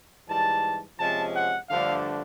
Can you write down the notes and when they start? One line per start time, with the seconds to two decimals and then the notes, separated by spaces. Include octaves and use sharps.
0.28 G#2 E3 G3 A5
0.99 C3 F3 G#3 C#4 A5
1.34 F#5
1.69 G2 D3 F3 A3 D4 F5